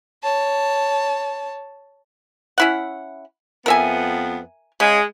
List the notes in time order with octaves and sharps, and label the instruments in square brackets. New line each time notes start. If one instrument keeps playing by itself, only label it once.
[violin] C#5 A5
[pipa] C#4 E4 F#5
[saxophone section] F2 B3 [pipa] A#4 E5 G#5
[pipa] C#3 [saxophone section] G#3